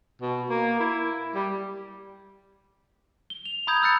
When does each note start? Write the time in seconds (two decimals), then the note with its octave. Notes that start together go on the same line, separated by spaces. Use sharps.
0.22 B2
0.50 A#3
0.80 E4
1.35 G3
3.30 G7
3.45 F7
3.67 A#5 B5 D#6 G6 G#6
3.83 E6 F#6 A6 C#7